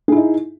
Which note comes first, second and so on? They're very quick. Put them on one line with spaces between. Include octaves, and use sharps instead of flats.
G#4 E4 D#4